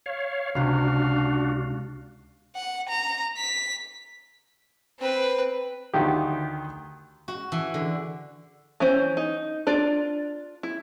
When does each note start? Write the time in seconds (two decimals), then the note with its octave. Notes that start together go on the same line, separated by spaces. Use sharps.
0.06 C#5 F5
0.55 C#2 C3 D4 F#4 F5
2.56 F#5
2.89 A#5
3.38 B6
4.99 C4 B4
5.94 D2 D#3 G4
7.28 F#4
7.52 E3
7.74 D3
8.80 E3 C#4 C5
9.17 D#4
9.67 D4 F4 D5
10.63 E4